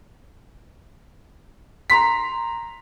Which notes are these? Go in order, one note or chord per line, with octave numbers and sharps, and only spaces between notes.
A#5 C6 B6